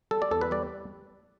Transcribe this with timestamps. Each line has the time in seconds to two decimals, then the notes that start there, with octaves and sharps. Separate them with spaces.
0.11 G3 A4
0.22 D5
0.31 E2 A4
0.41 B4
0.51 G3 D5